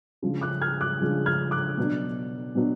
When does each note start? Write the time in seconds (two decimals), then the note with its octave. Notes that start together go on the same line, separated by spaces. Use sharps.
0.22 C#3 F3 G#3 D4
0.41 D6 F#6
0.62 F6 G#6
0.81 D6 F#6
1.00 C#3 F3 G#3 D4
1.26 F6 G#6
1.51 D6 F#6
1.78 B2 F#3 B3 D4
2.55 B2 F#3 B3 D4